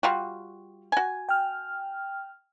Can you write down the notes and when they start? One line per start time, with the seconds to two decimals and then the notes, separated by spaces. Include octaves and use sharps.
0.03 G3 F4 F#4
0.92 F#4 G#5
1.29 G5 F6